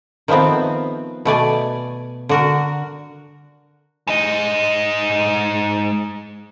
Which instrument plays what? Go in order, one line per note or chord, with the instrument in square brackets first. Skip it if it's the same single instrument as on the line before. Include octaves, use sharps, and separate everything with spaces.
[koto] D#3 F3 A3 B3 C4
B2 A3 D5 G#5
D3 F#4 A#4
[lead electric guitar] G#2 D#5